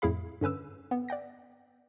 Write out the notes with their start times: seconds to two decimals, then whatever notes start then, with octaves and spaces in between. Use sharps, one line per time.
0.02 F2 A2 E4 G#4 F5 B5
0.41 G2 D3 C#4 B4 E6
0.91 B3
1.09 D5 F#5 G5 A#6